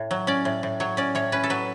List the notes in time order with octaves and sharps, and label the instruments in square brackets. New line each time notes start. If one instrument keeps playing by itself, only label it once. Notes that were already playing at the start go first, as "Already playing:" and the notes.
Already playing: [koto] A2
F#3
C#4 D5
A2
A2
F#3 C#5
C#4 D5
A2 C#5
C#4 B4
A4
F#3 B4